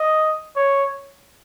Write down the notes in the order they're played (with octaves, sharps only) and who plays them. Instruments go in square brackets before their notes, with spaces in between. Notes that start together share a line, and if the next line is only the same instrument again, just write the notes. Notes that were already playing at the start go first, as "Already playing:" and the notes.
Already playing: [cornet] D#5
C#5